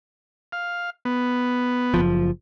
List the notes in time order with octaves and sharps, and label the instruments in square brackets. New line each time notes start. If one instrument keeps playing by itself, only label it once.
[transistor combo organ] F5
B3
[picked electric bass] F#1 B1 F3